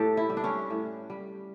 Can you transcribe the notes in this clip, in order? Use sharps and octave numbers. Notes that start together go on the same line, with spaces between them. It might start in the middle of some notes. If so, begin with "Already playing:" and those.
Already playing: A2 G4 A4
E4
G3
D4
C#4
A2
G3